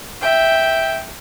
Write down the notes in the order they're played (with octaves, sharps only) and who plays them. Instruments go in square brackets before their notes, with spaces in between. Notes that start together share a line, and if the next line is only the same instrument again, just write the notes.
[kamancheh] E5 G5